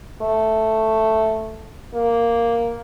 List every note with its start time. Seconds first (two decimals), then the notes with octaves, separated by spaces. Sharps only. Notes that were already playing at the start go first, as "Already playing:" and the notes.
0.22 A3
1.95 A#3